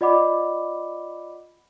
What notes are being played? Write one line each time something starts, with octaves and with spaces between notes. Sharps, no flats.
F4 D5 D#5 F#5 B5 D6